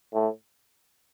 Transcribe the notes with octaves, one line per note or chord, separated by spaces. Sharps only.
A2